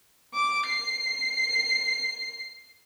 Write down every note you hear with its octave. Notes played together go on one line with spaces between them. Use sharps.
D6
C7